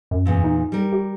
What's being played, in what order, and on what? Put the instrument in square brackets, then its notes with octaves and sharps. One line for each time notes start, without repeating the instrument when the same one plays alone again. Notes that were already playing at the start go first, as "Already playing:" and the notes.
[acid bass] F#2
[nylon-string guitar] E2 A#2
[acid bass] D#4
[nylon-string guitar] G3 A#4
[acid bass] G4